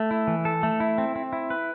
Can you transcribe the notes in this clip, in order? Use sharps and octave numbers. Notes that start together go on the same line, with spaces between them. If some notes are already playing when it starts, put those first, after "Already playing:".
Already playing: A3
E4
E3
A4
A3
E4
C4
C4
E4
B4